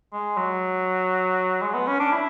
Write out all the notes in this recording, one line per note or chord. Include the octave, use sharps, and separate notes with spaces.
G#3
F#3
G#3
B3
C#4
D4
E4